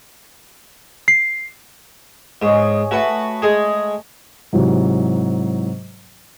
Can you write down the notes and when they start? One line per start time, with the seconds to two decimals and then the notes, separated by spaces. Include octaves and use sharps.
1.08 C7
2.42 G#2 G#4 C#5 D#5
2.91 A3 F#4 B4 F#5 A5
3.42 G#3 G#4
4.53 G#2 C3 E3 F#3